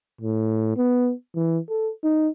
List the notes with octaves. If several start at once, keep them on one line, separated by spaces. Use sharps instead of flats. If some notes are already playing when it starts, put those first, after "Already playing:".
A2
B3
E3
A4
D#4